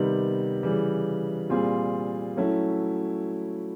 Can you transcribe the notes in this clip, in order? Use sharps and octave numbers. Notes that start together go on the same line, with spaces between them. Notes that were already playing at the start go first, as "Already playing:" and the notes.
Already playing: C3 D#3 G3 B3
C#3 E3 G3
A#2 G3 C4 F4 G#4
F#3 A3 C#4 E4